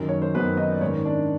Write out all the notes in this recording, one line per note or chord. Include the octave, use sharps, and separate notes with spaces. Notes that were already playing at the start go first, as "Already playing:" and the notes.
Already playing: F#2 D#3
C#5
C5
F#2 D#3 B3 B4
D#4 D#5
D5
G#2 D#3 C#4 C#5
D4 D5